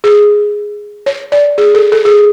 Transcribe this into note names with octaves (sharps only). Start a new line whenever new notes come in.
G#4
C#5
D5
G#4
A4
A4
G#4